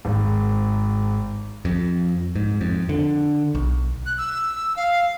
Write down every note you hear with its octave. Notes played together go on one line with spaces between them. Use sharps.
G#1
F2
G#2
F2
D3
B1
F#6
E6
F5